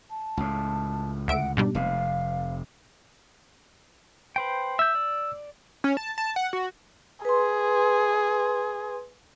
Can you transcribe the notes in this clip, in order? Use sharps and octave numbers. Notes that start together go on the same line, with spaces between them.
A5
C#2 A2
D2 E5 F#5 D7
G#2 B2 G3 D4
F1 C3 F5
B4 C5 G5
E5 E6 G6
D5
C#4
A5
A5
F#5
F#4
G#4 B4 C6